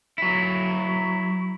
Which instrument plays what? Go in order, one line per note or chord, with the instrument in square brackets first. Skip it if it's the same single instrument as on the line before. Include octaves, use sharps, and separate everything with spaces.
[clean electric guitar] F#3 E4